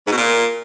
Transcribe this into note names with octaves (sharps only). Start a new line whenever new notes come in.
G#2
B2
A#2